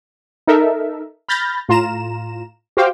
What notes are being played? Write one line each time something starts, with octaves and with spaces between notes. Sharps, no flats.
D#4 A4 A#4 E5
B5 F6 G6 A6 A#6
A2 F4 A#5 E7
F#4 G4 C5 F5 G5